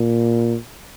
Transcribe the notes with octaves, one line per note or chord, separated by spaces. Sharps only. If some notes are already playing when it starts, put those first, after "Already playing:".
Already playing: A#2